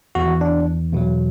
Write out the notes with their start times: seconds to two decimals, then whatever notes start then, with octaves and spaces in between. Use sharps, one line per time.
0.15 E2 E3 F#4
0.41 D4
0.93 E2 B2 F#3